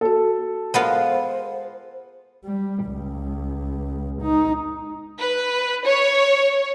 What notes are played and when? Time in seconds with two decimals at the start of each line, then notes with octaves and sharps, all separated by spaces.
0.01 A#3 F#4 A4
0.74 G#3 B3 F4 A#4 C5 F5
2.45 G3
2.86 C#2
4.22 D#4
5.19 B4
5.86 C#5